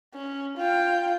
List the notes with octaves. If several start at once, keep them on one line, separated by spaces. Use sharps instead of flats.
C#4
F4 G5